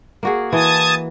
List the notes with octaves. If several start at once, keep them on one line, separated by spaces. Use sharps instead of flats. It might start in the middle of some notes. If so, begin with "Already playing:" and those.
A#3 F#4 G#4
E3 A5 D#6 G#6